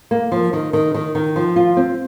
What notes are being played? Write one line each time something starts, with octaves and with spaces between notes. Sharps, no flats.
A#3
F3
D#3
D#3
D#3
D#3
F3
F4
C4